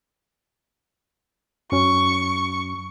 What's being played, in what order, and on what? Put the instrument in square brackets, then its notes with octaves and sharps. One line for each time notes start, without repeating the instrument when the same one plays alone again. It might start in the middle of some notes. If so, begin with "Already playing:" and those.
[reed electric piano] F#2 F#3 C#4 [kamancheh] C#6